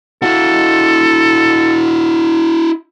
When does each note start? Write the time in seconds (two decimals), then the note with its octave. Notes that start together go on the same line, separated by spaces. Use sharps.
0.22 E4 F#4 A4